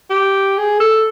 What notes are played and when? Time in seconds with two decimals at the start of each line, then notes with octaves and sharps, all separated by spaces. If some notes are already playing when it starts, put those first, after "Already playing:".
0.10 G4
0.58 G#4
0.80 A4